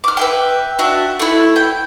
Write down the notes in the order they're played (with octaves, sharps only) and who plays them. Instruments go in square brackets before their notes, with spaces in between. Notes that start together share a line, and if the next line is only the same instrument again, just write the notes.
[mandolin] D6 F6
B4 E5 G5
D4 F#4 E5
A3 E4
G5